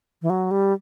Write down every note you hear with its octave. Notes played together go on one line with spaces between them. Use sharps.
E3
F#3
G3